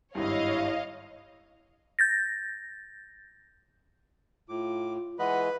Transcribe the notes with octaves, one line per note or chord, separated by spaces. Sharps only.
G#1 G2 E4 C#5 D#5 F5
G6 A6 A#6
A2 F4 D6
E3 G#3 B4 D#5 F#5 B5